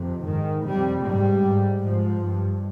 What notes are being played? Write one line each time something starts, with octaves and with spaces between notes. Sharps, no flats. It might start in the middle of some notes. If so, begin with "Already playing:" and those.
Already playing: F2 C3
G#2 D#3
F2 C3 G3
G#2 G3
G#2
G#2 F3
G2